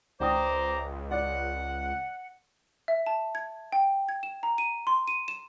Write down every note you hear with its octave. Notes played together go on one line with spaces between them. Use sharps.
C#2 C5 D5 G5 A#5 D6 D#6
D5 F#5
E5
A5
G#6
G5
G#6
E7
A#5
D#7
C6
D#7
E7